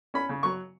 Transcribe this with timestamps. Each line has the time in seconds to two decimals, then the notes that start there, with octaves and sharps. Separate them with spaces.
0.14 C#4 B5
0.29 C#3
0.43 F#3 C#6